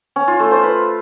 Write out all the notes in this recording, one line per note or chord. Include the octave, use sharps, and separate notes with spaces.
C#4
F4
A3
C5
B4